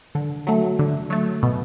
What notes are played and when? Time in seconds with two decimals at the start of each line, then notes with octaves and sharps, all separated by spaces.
0.15 D3
0.47 F#3 A3
0.79 D3
1.10 F#3 A3
1.43 B2